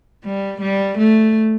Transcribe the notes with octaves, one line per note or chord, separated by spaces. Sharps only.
G3
G3
A3